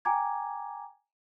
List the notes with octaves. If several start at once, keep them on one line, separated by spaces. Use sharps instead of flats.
G5 G#5 A#5 D6 G#6